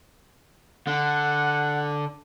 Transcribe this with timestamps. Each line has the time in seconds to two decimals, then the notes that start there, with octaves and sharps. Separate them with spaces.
0.87 D3 F#5